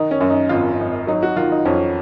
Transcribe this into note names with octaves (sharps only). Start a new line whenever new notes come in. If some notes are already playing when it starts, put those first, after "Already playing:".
Already playing: D#3 D#4
C#4
F#2
D#4
G#1 F4
G#1
F#3 D#4
F#4
D#3 F4
D#4
F2 C#4